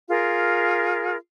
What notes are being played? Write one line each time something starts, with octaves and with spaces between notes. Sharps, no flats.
F4 G#4 A#4